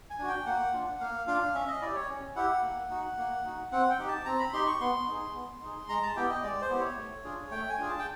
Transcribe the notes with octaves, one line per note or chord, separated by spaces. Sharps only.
G#5
D4 F#4
G5
A#3 F#5
D4 F4
A#3 F5
D4 F4 F5
C#4 E5
D#5
E4 G4 D5
C#5
C#4
E4 G4 F#5
A#3
D#4 F#4
A#3
D#4 F#4
C4 F#5
G5
D#4 G4
A5
C4 A#5
B5
D#4 G4 C6
C#6
B3 C6
D#4 G#4
B3
D#4 G#4
G#3 A#5
A5
B3 E4 G4 G5
D#5
G#3 D5
C5
B3 E4 G4
C#5
A3
D4 F4 G#4
A3 G5
G#5
D4 F4 G#4
A5
G5